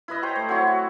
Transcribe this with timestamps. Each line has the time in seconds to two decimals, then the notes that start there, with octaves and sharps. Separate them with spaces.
0.08 E4 B4 D#5
0.23 C5 C#5 G5 A#5
0.35 A3
0.49 F#3 C4 E4 C#5
0.67 F#4